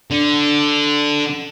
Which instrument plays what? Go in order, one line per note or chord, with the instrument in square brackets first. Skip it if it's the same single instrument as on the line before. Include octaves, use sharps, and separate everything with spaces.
[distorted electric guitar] D3